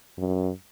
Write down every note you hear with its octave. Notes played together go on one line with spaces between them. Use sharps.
F#2